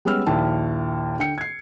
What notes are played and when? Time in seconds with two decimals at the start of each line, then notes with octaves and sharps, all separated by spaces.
0.05 G3 G#3 B3 C#4 E6 F6
0.26 A#1 D#2 E4 A5
1.19 D3 G5 C#7
1.38 G#6 C7